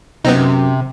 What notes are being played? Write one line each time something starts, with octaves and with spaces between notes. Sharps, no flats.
F#2 C3 B3 C4 D#4